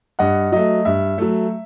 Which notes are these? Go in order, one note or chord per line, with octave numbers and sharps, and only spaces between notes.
G2 D#5 F#5
F#3 A3 D#5
G2 E5
F#3 A3